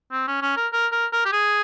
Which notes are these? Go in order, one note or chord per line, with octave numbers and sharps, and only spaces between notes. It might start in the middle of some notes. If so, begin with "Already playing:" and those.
C4
C#4
C#4
A#4
A#4
A#4
A#4
G4
G#4